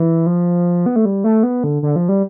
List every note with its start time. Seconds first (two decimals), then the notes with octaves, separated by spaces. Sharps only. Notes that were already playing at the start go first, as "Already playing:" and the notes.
Already playing: E3
0.26 F3
0.86 B3
0.96 A3
1.05 G3
1.24 A3
1.43 B3
1.64 D3
1.83 D3
1.96 F3
2.09 G3